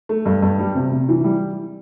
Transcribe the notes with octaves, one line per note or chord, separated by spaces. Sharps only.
A3
G2
G2
G3
C3
C3
E3
G3